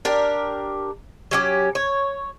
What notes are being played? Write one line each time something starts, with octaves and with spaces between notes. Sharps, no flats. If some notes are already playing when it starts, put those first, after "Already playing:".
D4 G4 A#4
F#3 C#4 G4
C#5